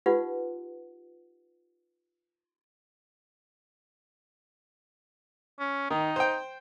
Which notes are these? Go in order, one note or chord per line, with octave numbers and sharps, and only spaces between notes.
D#4 F4 G4 B4 F#5
C#4
D#3 D#4
C5 G5